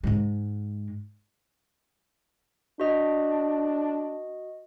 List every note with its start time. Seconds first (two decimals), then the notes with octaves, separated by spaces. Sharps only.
0.03 G#2 G#3
2.80 D4 F#4 D#5